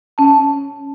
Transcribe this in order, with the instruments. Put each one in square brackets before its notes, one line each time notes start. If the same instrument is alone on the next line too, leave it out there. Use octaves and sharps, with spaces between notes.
[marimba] C#4 A5